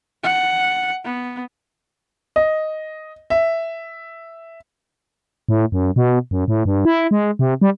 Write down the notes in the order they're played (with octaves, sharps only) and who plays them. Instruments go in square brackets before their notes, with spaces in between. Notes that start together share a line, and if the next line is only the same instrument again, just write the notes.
[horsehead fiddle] F#5
B3
[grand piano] D#5
E5
[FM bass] A2
F#2
B2
F#2
A2
G2
E4
G#3
C3
G3